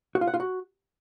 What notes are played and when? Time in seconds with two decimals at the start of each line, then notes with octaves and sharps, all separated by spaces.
0.15 F#4
0.21 F4
0.27 F#5
0.34 F4
0.40 F#4